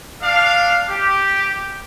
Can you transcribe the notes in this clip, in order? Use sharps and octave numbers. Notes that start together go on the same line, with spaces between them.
D4 F5
G4